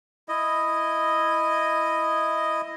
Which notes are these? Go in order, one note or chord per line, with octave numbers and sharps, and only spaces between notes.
E4 D#5